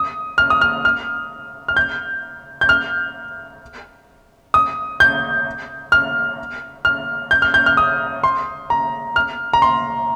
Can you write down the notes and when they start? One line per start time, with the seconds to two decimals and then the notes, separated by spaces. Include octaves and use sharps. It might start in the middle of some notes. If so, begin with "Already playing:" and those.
Already playing: D#6
0.38 F6
0.50 D#6
0.61 F6
0.85 F6
1.68 F6
1.77 G6
2.61 G6
2.69 F6
4.54 D#6
5.00 G6
5.92 F6
6.85 F6
7.31 G6
7.42 F6
7.54 G6
7.66 F6
7.77 D#6
8.24 C6
8.70 A#5
9.16 F6
9.53 A#5
9.62 C6